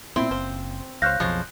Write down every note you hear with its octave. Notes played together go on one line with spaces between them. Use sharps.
G2 A#2 C4 E4 C6
F#1 F3 C5
C#2 C5 C#5 F5 F#6 G6 A#6
B1 F2 F3 G#3 C4 C5 C#5